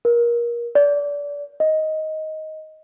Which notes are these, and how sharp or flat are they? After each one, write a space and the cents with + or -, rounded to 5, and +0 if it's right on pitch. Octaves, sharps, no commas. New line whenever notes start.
A#4 +25
D5 -25
D#5 +10